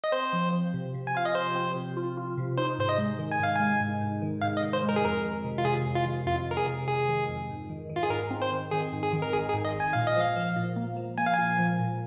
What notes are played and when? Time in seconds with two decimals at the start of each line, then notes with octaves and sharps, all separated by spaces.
0.04 D#5
0.12 C4 C5
0.33 F3
0.53 F3
0.74 C3
0.94 C3
1.07 G#5
1.15 F4 F5
1.25 D#5
1.35 C3 C5
1.55 C4
1.75 C3
1.97 F4
2.17 F4
2.37 C3
2.58 D#4 C5
2.79 G#2 C5
2.89 D#5
2.98 G#3
3.19 D#3
3.32 G#5
3.40 G#2 F5
3.55 G#5
3.60 G#3
3.81 G#2
4.01 G#2
4.22 D#3
4.41 G#2 F5
4.57 D#5
4.62 D#3
4.73 C5
4.83 G#3
4.89 A#4
4.96 G#4
5.04 F2 A#4
5.24 D#3
5.44 C3
5.58 F4
5.65 C3 G#4
5.86 F2
5.95 F4
6.06 D#3
6.26 F2 F4
6.46 F2 A#4
6.57 G#4
6.67 C3
6.88 C3 G#4
7.09 D#3
7.28 F2
7.49 G#2
7.70 D#3
7.90 D#3
7.96 F4
8.03 G#4
8.10 G#2 A#4
8.31 C4
8.42 C5
8.52 D#3
8.71 D#3 G#4
8.93 G#2
9.03 G#4
9.13 D#3
9.22 A#4
9.33 G#1 G#4
9.49 G#4
9.54 G#2
9.65 D#5
9.74 G#1
9.80 G#5
9.93 A#2 F5
10.07 D#5
10.16 F3 F5
10.36 F3
10.56 A#2
10.76 A#3
10.97 F3
11.18 A#3 G#5
11.26 F5
11.34 A#2 G#5
11.59 F3
11.79 A#2